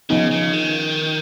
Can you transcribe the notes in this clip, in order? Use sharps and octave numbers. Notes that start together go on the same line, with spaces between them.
C#3 F3 B3 D#4
C#3
D#3